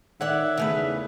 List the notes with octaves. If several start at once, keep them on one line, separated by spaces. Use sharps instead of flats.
D#3 C#5 D5 E5 F#5
E2 C#3 A3 B4